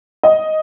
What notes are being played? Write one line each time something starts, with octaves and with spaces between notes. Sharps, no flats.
D#5